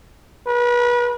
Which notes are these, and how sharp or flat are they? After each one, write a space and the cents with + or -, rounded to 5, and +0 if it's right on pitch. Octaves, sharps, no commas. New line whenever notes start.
B4 -35